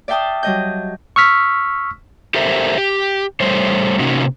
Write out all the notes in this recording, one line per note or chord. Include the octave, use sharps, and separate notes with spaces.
D5 E5 F5 G5 A5 D#6
F#3 G3 D#5 G6
C#6 E6 F6 B6
G4 A4 A#4 C5 E5
G4
G3 A3 C5 C#5
C3 A#3 C#4 D#4 F#4